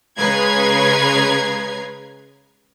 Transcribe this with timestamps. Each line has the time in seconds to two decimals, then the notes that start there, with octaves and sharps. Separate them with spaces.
0.19 C#3 G#3 B4 A#5 G#6 C7